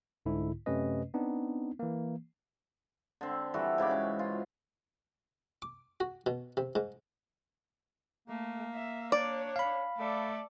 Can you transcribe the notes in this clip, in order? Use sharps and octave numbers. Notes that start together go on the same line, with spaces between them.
C2 G#2 D3 E4
F#2 C3 A3 C#4 B4 D#5
B3 C4 D4 D#4
E3 A#3
D3 C4
E3 G3 F#4 A4
G#2 C#3 B5 D6
C#4
F4
D6
F#4
B2
C3
G#2
A3 A#3
E5
D4 C#5 D5
F5 B5
A3 A4 D5